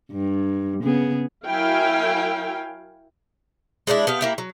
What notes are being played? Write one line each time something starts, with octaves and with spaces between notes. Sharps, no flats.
G2
C#3 B3 G#4
F#3 E4 A#4 F5 G5 G#5
G#3 C4 D4 E4
B3 G4 F5
A#3 E4 G4
F#3